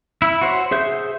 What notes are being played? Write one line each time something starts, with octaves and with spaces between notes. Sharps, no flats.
E4 E5
F#4 C5 C#5
G#4 C5 E5 G6